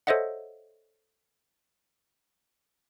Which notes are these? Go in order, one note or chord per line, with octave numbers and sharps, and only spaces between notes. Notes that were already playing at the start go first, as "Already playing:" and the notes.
A4 C5 C#5 D#5 E5 F#5